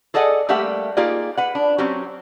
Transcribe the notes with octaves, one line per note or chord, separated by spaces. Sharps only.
G#4 A4 D5 D#5 F#5 G#5
G3 A3 A#3 G4 E5 F#5
A#3 D#4 F4 G4 G#4 D5
B4 F#5
D4
F#3 C4 C#4 G4